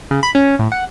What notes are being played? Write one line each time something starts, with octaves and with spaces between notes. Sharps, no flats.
C#3
B5
C#4
A2
F#5